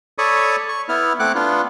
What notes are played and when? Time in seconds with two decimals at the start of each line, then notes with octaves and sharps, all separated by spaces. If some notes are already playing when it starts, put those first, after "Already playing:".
0.18 A4 C#5 D5 B5 C#6 D#6
0.69 C#6
0.89 B3 E4 F6
1.20 A3 C4 F#5 D6 F#6
1.35 B3 D4 F4